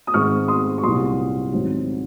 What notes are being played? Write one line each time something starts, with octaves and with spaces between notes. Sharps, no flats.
D#6
G#2 D#3 G#3 C4 C#6 F6
C6 D#6
C#6
C2 A#2 F#3 C6 D#6
G#1 G#2 F#3 C4 D#4